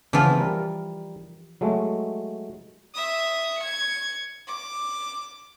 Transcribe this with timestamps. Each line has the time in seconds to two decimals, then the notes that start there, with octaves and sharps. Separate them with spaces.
0.13 C#3 E3 F3 B3 F4
0.39 G3 A#4
1.61 F#3 G#3 A3
2.94 E5 D#6
3.58 G#6 C#7
4.47 D6